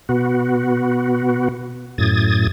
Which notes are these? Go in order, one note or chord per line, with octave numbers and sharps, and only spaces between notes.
B2 B3 F#4
F#2 A2 D#6 G#6 A6